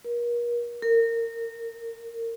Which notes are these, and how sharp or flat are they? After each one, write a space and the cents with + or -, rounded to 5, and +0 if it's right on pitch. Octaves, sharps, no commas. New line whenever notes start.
A#4 +40
A#4 -25